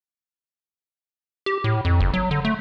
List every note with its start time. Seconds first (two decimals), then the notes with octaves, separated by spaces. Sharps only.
1.46 G4
1.64 A2
1.85 F2
2.00 F#1
2.14 F#3
2.31 D3
2.45 A3